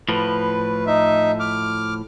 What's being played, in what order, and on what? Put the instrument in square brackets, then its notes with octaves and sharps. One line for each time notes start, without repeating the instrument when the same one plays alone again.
[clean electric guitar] A2 F3 [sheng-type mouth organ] B4
[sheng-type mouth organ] D#4 E5
D6 F6